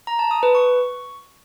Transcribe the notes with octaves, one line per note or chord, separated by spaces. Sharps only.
A#5
A5
D#6
B4
C#6